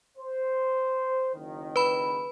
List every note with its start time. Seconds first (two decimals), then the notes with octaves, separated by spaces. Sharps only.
0.18 C5
1.35 F#1 D#3
1.76 B4 B5